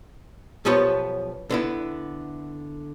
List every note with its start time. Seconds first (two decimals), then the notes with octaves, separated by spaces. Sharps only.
0.65 B1 F#2 F3 B3 G4 C#5
1.50 D3 B3 E4